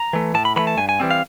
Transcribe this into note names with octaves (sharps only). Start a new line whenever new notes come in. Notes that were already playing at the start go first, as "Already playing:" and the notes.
Already playing: A#5
E3 A3
A2 A5
B5
E3 A3 B5
A5
G2 G#5
G#5
E3 G3 C4
F5